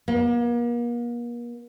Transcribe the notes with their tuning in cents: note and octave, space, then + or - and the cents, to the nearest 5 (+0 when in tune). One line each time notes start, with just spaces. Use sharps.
A#3 +40